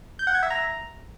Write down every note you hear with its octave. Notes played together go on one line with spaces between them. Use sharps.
G6
F#5
G#6
E5
A#5